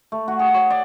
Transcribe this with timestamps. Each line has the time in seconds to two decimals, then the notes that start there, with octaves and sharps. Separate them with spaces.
0.12 A3
0.28 F#4
0.39 G#4
0.54 C#5
0.70 D5